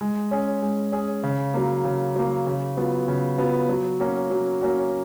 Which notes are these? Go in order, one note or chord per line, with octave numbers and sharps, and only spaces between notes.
G#3
C#4 G#4
G#3
C#4 G#4
C#3
F#3 A#3
C#3
F#3 A#3
C#3
F#3 B3 F4
C#3
F#3 B3 F4
F#3
A#3 C#4 F#4
F#3
A#3 C#4 F#4